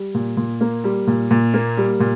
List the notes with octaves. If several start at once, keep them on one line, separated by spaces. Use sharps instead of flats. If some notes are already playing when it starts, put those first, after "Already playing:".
Already playing: G3
A#2
A#2
A#3
G3
A#2
A#2
A#3
G3
A#2